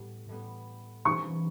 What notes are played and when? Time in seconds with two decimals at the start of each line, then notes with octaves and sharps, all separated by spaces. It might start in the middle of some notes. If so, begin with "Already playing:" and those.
Already playing: A2 G3 B3
0.29 A2 G3 B3
1.05 E3 G3 C#4 C#6